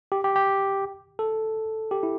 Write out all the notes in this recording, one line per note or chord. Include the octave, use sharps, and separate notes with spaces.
G4
G4
G4
A4
G4
E4